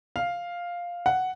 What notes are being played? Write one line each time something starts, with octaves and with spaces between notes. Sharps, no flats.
F5
F#5